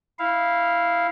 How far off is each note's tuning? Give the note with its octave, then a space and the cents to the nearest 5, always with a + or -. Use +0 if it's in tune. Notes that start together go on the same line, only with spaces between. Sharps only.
E4 -15 F5 -10